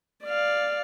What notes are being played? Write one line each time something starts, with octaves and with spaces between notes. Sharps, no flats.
D5 F5